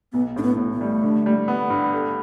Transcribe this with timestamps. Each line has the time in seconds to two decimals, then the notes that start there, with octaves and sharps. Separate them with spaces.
0.13 B1 B3
0.36 A2 D4
0.43 B3
0.58 A2
0.73 A3
0.81 G3
1.03 D3
1.26 G3
1.48 B3
1.70 G2
1.93 A3